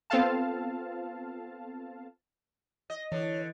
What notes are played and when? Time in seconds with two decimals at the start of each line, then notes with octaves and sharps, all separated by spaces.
0.10 B3 C4 F4 A4 F5 A5
2.90 D#5
3.12 D3 E3 C#5